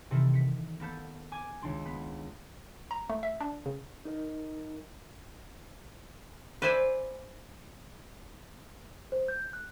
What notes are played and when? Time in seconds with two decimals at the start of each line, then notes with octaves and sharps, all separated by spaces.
0.11 C3 D#3 E3 C4 A4 A#4
0.34 B6 C#7
0.80 A#3 B3 A4 G6
1.32 G#5 D6 G#6
1.62 C#2 D#3 D4 C6
1.85 B3
2.91 A#5
3.10 A3
3.23 E5
3.41 D4
3.66 C#3
4.05 D#4 A#4 D#5
6.62 B4 C5 D5 E5 G#5
9.12 C5
9.28 G6
9.53 F#6